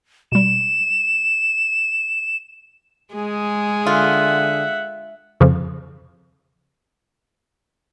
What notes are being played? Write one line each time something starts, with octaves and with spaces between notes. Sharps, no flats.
B2 G3 E7
G#3 G#4
D3 F4 E5 F#5
F2 C#3 F3